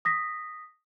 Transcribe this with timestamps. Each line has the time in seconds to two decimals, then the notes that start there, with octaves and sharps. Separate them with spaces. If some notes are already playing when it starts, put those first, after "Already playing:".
0.05 D#6 A#6 B6